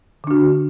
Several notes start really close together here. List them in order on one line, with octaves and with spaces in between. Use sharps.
D3 D4 F#4